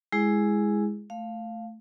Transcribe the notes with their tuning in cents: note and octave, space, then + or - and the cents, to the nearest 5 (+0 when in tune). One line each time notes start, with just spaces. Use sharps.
G#3 +0 E4 +0 G#4 +0
A3 +0 F5 +0